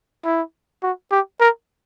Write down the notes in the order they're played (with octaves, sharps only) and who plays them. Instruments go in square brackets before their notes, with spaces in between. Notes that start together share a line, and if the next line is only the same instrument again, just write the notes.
[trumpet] E4
F#4
G4
A#4